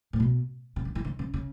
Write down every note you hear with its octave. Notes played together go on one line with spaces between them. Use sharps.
A2
B2
C#3
D3
E3
D3
C#3
C#3